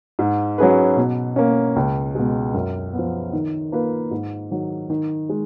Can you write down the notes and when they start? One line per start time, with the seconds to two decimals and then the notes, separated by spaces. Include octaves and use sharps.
0.19 G#2
0.58 F#3 C#4 G#4 B4
0.97 B2
1.36 A#3 C#4
1.76 C#2
2.15 B2 G#3
2.54 F#2
2.93 F3 B3
3.33 D#3
3.72 A#3 F4 B4
4.11 G#2
4.51 D#3 F#3
4.90 D#3
5.29 G#3